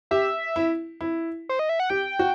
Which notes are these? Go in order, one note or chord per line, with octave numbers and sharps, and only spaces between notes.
G4 E5
E4
E4
C5
D#5
E5
F#5
G4 G5
F#4